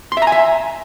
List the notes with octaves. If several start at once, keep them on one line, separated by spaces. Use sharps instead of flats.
C6
E5
A#5
G#5
E5